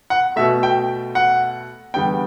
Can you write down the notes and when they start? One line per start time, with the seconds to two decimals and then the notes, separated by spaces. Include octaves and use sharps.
0.10 F#5
0.36 B2 A3 E5
0.63 G5
1.15 F#5
1.94 E2 D3 G3 B3 G5